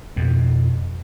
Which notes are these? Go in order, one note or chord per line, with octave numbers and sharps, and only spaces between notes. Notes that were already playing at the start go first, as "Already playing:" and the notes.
F2 B2